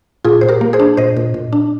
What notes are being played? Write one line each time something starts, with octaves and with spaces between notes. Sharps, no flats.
A#2 F4 G#4
A#2 C5
G4 A#4
A#3
G#4 C5
D4
A#2 C5 D#5
A#2
A#2
D4